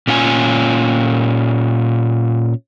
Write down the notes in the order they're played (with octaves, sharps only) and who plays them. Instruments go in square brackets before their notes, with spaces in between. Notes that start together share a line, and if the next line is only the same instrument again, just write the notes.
[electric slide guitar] A#2 C#4 F4 G#5